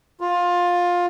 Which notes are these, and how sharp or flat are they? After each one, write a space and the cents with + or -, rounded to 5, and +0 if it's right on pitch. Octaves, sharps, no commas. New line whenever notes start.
F4 +15